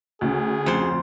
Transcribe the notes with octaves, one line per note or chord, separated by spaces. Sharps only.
D2 C#3 G#4
F2 C5